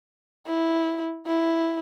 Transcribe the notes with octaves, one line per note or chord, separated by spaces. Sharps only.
E4
E4